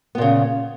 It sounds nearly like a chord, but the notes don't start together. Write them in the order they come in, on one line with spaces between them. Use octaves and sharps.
B3 A#2 C#3